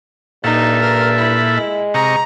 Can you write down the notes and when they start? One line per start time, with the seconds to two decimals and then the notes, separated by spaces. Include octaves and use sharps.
0.44 G2 A#2 D#4 A4 E5
0.81 A#4
1.18 E4
1.55 G#3
1.94 C3 D#5 A#5 C#6